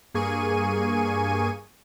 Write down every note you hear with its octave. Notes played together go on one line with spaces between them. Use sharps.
G2 A#3 G#4 G#5 C#6 D#7